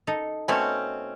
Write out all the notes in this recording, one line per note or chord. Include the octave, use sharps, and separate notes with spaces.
D#4 A4 D#5
B2 A3 C4 C#4 C#5